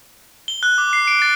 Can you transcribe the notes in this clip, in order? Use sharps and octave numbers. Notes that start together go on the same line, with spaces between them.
G7
F#6
D6
C7
D7
A6